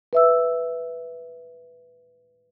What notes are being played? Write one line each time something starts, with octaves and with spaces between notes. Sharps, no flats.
B4 E5 E6